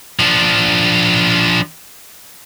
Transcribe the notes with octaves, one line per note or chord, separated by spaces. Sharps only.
F3 D4